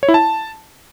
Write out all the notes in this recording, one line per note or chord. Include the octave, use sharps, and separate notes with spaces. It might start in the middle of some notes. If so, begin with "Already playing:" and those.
C#5
E4
A5